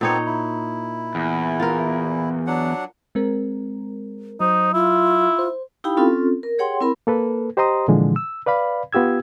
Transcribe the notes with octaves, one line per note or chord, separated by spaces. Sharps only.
A#2 B3 C4 D#4 A4 C#5
E4
E2
F4 A#4
F#3 D4 F#5
G#3 C4 A#4
F#3 D#4 C5
E4 F4
C5
D#4 E4 G4 F5 G5 B5
C4 C#4 F4 A4
A#4
G4 G#4 C#5 F#5 G5 C6
C4 E4 A#4 B5
A#3 A4 B4
G4 C5 D#5 A#5 C6 D#6
A#2 D3 E3 F3 G#3
E6
B4 D5 F5 B5
B3 F4 G4 E6 G#6